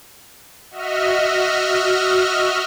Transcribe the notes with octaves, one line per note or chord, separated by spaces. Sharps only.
F#4 D#5 E5 F6